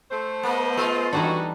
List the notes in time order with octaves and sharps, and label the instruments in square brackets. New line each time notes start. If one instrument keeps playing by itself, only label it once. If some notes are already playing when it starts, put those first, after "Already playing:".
[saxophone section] A3 A4 C5
[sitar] A#3 [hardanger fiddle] B3 D#5
[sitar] G#3 F4
[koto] E3 G3 D4 [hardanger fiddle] D#4 A4 [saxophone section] F#4